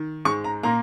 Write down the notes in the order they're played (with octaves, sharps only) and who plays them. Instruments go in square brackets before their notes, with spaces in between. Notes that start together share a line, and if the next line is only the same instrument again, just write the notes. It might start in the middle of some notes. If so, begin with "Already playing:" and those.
Already playing: [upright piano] D#3
G#2 G#3 C#6
A#5
A#2 A#3 A#5